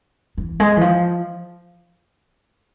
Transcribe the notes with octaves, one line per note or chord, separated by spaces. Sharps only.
E3
G#3
E3
F3